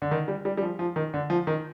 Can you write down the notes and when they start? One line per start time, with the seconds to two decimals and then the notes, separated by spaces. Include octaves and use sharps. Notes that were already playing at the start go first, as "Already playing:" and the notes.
0.02 D3
0.11 D#3
0.28 G3
0.45 G3
0.57 G3
0.62 F3
0.79 F3
0.96 D#3
1.14 D3
1.30 F3
1.47 D#3